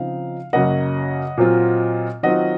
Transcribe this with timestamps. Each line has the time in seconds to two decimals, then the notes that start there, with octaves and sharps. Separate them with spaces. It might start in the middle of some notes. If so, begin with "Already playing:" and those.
Already playing: C#3 F3 C4 D#4 F5
0.53 F#2 C#3 F#3 A#3 D#5 F#5
1.38 A#2 F#3 C4 F4
2.23 D#3 F#3 C4 F4 D#5 F#5